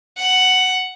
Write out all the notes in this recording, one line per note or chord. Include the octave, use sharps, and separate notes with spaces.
F#5